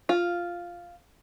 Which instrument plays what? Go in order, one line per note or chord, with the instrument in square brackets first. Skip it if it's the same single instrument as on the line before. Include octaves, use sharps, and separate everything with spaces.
[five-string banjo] F4